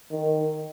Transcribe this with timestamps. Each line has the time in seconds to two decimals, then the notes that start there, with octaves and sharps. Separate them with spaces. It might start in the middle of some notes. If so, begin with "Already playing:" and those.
0.11 D#3